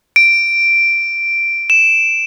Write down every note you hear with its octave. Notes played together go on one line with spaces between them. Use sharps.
D7
E7